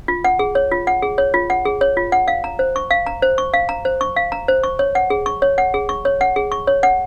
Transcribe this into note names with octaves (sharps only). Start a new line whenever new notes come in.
F4
F#5
G#4
C#5
F4
F#5
G#4
C#5
F4
F#5
G#4
C#5
F4
F#5
F5
A#5
C5
C#6
F5
A#5
C5
C#6
F5
A#5
C5
C#6
F5
A#5
C5
C#6
C#5
F#5
G#4
C#6
C#5
F#5
G#4
C#6
C#5
F#5
G#4
C#6
C#5
F#5